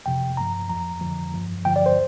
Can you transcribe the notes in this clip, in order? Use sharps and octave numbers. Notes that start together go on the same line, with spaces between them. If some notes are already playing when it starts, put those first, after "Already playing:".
F2 C3 F3 G5
G2 F3 A#5
F2 F3 A#5
F2 D3 F3
G2 F3
G2 D3 F3 G5
D5
C5